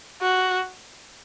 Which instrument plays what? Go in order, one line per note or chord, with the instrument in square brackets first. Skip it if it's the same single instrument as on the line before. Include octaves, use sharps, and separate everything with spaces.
[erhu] F#4